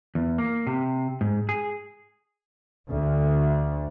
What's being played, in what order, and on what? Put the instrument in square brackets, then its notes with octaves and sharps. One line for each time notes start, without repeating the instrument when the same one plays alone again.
[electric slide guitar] E2
A#3
C3
G#2
G#4
[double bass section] D2